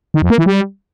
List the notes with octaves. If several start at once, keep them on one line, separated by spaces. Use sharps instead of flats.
D#3
F2
A#3
E3
G3